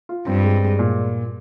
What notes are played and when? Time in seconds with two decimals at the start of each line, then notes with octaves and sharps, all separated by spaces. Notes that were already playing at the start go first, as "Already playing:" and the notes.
0.09 F4
0.27 G2 C4
0.44 G#3
0.62 G#3
0.79 A#2